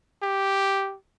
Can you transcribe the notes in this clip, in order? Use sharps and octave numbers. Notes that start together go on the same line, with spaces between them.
G4